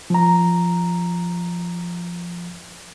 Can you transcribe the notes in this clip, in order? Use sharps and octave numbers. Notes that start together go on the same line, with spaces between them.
F3 A#5